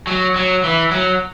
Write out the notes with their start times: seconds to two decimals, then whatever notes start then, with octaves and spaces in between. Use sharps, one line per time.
0.07 F#3
0.36 F#3
0.64 E3
0.91 F#3